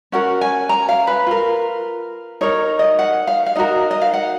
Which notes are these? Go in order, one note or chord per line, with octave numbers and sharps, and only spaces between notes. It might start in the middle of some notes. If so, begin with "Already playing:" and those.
C#4 F#4 A#4 F#5
G#5
A#5
F5
B4
F4 A#4
D#4 A#4 C#5
D#5
F#5
F5
F5
D#4 F#4 A#4 D#5
D#5
F5
F#5